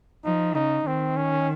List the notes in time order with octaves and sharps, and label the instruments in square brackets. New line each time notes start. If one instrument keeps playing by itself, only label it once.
[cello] F3 [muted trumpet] D#4
[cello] C#3 [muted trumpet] D#4
[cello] D#3 [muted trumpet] C4
[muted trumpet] C#4